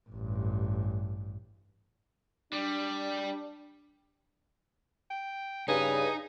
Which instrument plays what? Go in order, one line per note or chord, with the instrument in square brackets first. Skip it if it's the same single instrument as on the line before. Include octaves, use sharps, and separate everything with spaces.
[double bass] A1 G2
[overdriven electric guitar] G3 [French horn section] D4
[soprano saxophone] G5
[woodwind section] G2 C#3 [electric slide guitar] D#4 [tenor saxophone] G#4 [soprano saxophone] B4